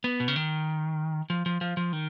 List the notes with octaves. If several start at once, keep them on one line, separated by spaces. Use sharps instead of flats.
B3
B2
C#3
D#3
F3
F3
F3
F3
D#3